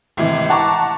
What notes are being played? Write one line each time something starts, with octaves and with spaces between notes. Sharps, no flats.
G#1 A2 C3 E3
F#5 A5 A#5 C#6 D6